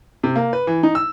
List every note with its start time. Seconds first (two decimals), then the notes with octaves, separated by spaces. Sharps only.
0.23 C3
0.35 A#3
0.53 B4
0.67 E3
0.83 D#4
0.95 E6